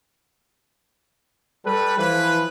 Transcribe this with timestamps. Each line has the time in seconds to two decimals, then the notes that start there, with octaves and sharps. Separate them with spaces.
1.65 G3 A4 B4
1.97 E3 F3 B4